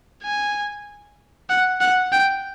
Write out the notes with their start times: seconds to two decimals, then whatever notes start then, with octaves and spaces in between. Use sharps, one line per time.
0.23 G#5
1.50 F#5
1.81 F#5
2.12 G5